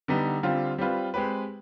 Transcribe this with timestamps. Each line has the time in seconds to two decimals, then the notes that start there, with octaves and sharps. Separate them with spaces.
0.08 D3 G3 B3 D#4
0.43 D3 G3 C4 F4
0.79 G3 C4 F4 B4
1.14 G#3 C4 G4 B4